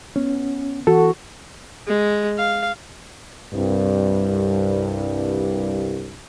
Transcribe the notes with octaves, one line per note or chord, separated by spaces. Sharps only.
B3 C#4
E3 F#4 A4
G#3
F5
C2 G2